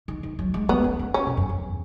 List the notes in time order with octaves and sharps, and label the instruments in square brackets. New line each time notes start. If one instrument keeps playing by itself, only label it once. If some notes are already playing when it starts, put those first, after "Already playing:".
[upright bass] D#3
D#3
F#3
G#3
[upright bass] A3 [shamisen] B3
[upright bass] C#4
C#4
[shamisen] C#4
[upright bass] B2
F#2
E2